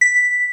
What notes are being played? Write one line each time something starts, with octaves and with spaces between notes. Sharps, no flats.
B6